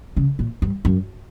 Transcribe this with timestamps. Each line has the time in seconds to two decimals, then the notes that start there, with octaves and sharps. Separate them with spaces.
0.17 C#3
0.39 A#2
0.62 G2
0.85 F#2